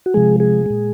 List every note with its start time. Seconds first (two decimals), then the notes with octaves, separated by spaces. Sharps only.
0.06 F#4
0.14 C3 F3 G#3 G#4
0.40 G#4
0.66 A#2 G#3